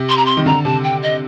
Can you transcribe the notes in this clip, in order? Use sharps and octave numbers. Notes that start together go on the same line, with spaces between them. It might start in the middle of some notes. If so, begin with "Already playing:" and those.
Already playing: C3
C6
A#5
C6
D#3
D3 A#5
C3 A5
G5
D#5